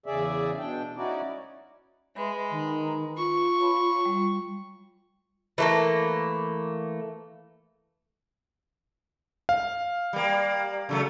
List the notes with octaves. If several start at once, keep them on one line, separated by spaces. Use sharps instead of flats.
E2 C#3 G#4 D5 E5
B2 D4 G5
C#4 D#4 E4 F#4 D5
G#3 B4 E5 B5
D#3
F4 C#6
C#5 A5 B5
G3
E3 A3 A#3
F5
G3 A#3
C#3 F#3 A3